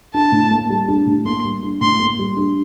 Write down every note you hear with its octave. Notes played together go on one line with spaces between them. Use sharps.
D4 A5
A2
A#3
G3
D4
A2
A#3 C6
G3
D4
A2 C6
A#3
G3
D4